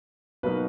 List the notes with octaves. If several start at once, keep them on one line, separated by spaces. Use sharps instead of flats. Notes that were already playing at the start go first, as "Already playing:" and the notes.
B2 F#3 A#3 D#4 B4